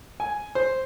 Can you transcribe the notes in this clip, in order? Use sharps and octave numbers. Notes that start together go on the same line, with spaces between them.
G#5
C5